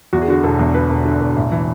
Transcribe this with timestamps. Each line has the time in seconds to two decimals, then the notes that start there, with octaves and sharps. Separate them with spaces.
0.13 E2 F#4
0.22 G#4
0.28 D3 F#4
0.43 E1 A4
0.59 E2
0.74 D3 B4
0.90 E1
1.05 D3
1.21 E1
1.36 A1
1.52 E3